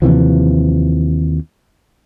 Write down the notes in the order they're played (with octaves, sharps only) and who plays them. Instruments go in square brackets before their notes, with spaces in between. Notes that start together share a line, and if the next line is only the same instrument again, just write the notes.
[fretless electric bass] D#2 C3 E3 F3